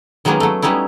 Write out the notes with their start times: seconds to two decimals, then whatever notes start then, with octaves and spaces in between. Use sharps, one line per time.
0.25 D#3 F#3 G#3 A#3 B3 C#4
0.40 F#3 A3
0.62 G3 B3 C#4 D#4 E4